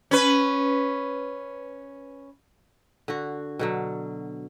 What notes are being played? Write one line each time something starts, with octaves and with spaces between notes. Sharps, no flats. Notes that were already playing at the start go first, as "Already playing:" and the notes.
C#4 B4
D3 F#4
B2 D3 F#3